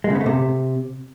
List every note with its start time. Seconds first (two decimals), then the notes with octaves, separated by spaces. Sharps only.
0.04 G#3
0.10 C#3
0.15 B3
0.21 A3
0.26 C3